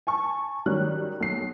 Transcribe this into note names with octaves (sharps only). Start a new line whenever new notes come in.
G#5 A5 C#6
D#3 F#3 G3 F#6
B1 C7